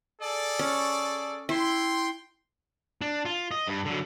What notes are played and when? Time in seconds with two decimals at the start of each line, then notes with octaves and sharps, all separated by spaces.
0.21 G#4 A4 D5
0.59 C#4
1.49 E4 G5 C6
3.01 D4
3.25 F4
3.51 D#5
3.67 G2
3.85 D3 F#3